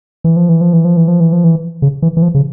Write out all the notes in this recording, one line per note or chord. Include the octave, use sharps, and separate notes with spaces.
E3
F3
E3
F3
E3
F3
E3
F3
E3
F3
E3
C#3
E3
E3
F3
C#3